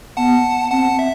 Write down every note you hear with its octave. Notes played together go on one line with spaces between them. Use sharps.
B3 F#5 A5
C4 F#5 A5
E5